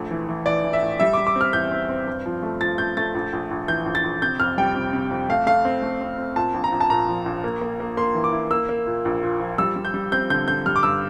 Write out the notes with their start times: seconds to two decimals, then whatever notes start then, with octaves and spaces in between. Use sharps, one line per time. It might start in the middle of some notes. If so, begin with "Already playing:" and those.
Already playing: A#1 A3
0.11 E3
0.29 E3
0.46 E3 D5
0.64 E3
0.73 E5
0.83 A2
1.00 G3 E5
1.13 G3 D6
1.27 D6
1.36 C4
1.41 F6
1.53 E2 G6
1.71 C4
1.89 C4
2.07 G2
2.26 F3
2.43 A3
2.61 F3 A6
2.78 A3 G6
2.97 A3 A6
3.15 A#1
3.33 A#1
3.51 A#1
3.68 E3 G6
3.86 A#1
3.95 A6
4.04 A#1
4.22 C3 G6
4.40 F2 F6
4.58 G3 G5
4.75 C3
4.93 C3
5.11 F2
5.29 A3 F5
5.47 A3 F5
5.65 C4
5.83 A3
6.01 C4
6.18 C4
6.36 A#2 A5
6.54 A#1
6.64 A#5
6.72 A#1
6.81 A5
6.90 A#2 A#5
7.09 F3
7.26 A#1
7.44 A#3
7.62 A#3
7.80 A#3
7.97 A#3 C6
8.15 E3
8.24 D6
8.33 E4
8.51 A#3 E6
8.69 A#3
8.87 A#2
9.05 A#1
9.23 A#2
9.40 F3
9.58 G3 E6
9.76 G3
9.85 G6
9.94 G3
10.12 C4 G6
10.30 D3 G6
10.48 D3 G6
10.66 G3 F6
10.76 D6
10.83 G2 E6